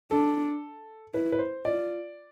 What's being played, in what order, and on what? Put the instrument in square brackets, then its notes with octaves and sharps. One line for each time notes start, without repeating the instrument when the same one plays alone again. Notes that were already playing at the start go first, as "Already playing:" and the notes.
[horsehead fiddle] D4 [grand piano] A4
[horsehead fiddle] E4 [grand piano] B4
[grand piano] B4
C5
[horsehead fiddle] F4 [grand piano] D5